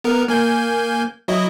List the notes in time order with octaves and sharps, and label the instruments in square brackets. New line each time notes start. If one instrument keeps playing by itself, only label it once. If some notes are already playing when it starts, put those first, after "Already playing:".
[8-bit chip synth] B3 A#4
A#3 G#5 G6
F#3 E4 D#5